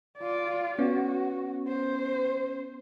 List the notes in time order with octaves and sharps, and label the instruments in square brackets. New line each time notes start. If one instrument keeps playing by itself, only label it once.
[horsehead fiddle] F4 D5
[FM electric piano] B3 C#4 [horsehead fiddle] F#4
[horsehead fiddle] C5